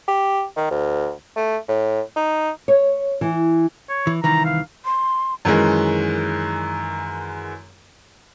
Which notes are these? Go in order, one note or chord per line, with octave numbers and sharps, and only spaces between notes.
G4
D#3
D2
A3
A2
D#4
C#5
E3
C#5
E3
C2 D#3 E3 A#5
F5
C6
F#2 D#3 E3 G#3